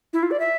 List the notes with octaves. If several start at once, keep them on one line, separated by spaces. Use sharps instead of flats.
E4
F4
D5
E5